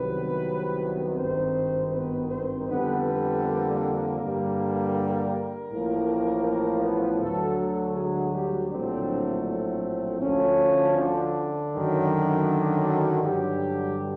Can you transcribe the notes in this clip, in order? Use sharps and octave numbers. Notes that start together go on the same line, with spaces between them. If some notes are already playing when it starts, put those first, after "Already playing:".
Already playing: C2 C3 D#3 F#3 B3 B4
G#1 G2 D#3 C4 C5
B3 B4
C4 C5
F2 D3 G3 B3 B4
B3 B4
A#3 A#4
G2 D3 G3
A1 A2 F3 A#3
A#3 A#4
B3 B4
D2 D3 F#3 A3 A4
A3 A4
G#3 G#4
G3 G4
A#1 A2 D3 F#3 A3 C4 D4
C4
D2 D3 F3 A3 C#4
D3 D4
F#2 D#3 F#3
G2 D3 F#3 G3 G4